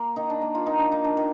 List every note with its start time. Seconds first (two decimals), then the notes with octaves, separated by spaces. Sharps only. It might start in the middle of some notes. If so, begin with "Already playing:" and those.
Already playing: A#3
0.16 D#3 D#4
0.30 D4
0.42 A#3
0.55 F4
0.66 D#3 D#4
0.79 D4
0.92 A#3 D#4
1.04 D4
1.17 D#3